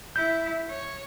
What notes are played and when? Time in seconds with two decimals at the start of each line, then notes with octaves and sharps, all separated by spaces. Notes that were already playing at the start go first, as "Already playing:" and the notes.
0.16 E4 G6
0.70 C#5